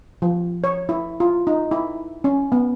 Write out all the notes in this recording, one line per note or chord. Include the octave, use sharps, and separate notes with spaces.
F3
C#5
E4
F4
D#4
E4
C#4
B3